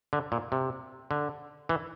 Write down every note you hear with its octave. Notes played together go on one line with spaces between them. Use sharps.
D3
A#2
C3
D3
E3